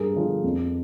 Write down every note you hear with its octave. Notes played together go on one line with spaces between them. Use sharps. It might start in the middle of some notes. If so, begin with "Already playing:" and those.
Already playing: G2 G#4 A#4
D3 F3
F2